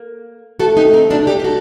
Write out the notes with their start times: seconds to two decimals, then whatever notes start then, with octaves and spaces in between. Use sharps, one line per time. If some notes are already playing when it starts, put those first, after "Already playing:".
Already playing: A#3
0.59 A3 F#4 A4
0.77 D#4 G4
0.93 C4 D#4
1.10 G3 D4 F#4
1.27 D#4 G4
1.40 G4
1.44 F#4 A4